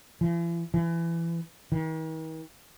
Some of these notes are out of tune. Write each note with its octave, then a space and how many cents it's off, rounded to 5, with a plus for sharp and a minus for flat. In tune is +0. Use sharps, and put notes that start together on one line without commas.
E3 +45
E3 +25
D#3 +45